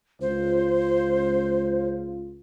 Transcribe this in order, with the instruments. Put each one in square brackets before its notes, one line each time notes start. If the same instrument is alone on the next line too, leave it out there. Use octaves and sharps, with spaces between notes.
[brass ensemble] C#2 F4 [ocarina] C5